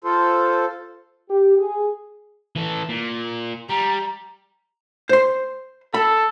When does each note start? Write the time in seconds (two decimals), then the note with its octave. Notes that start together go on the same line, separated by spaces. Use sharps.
0.04 F4 A4 C5
1.30 G4
1.59 G#4
2.56 E3 A4
2.89 A#2
3.70 G3 A#5
5.09 C5 C6
5.94 A4 B5